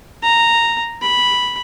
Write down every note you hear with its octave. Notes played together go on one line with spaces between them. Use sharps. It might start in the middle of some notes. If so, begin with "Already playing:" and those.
A#5
B5